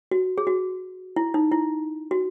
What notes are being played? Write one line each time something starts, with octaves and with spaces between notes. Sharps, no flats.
F#4
G#4
F#4
E4
D#4
E4
F#4